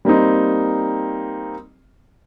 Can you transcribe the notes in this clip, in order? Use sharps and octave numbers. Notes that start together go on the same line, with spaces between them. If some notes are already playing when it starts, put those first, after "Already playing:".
G3 A#3 C4 D#4